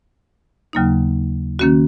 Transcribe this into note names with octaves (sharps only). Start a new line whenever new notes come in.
D#2 C#3 F#3 A#3 D#4
D#3 A#3 C#4 F#4